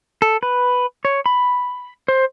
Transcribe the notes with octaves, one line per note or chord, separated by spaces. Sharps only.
A4
B4
C#5
B5
C5